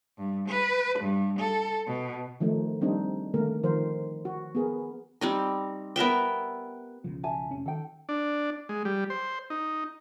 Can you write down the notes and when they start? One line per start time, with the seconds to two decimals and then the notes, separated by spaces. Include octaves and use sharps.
0.18 G2
0.48 B4
0.99 G2
1.39 A4
1.87 B2
2.40 D#3 F3 A3 D#4
2.81 G3 C4 D4 D#4
3.34 D3 D#3 A3 A#3 A#4
3.63 D#3 F3 A#4 C5
4.25 F#4
4.55 B3 G#4 A#4
5.21 G3 C4 D#4
5.96 B3 A#4 E5 G5
7.04 B1 C#3 F3
7.23 E5 G#5 A5
7.51 F1 C3 C#4
7.66 D#3 A4 G5
8.09 D4
8.69 G#3
8.85 G3
9.10 C5
9.50 D#4